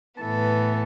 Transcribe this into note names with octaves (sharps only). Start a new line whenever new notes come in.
A2 E3 B3 A4